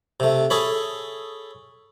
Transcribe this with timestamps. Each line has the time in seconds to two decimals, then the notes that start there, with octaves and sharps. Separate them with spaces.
0.20 C3 A3
0.50 G#4 A4 C#5 B5